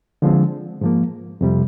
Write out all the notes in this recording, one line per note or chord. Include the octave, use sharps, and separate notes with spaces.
D3 F3 G#3 C4
G#2 F3 A#3
F2 C3 G3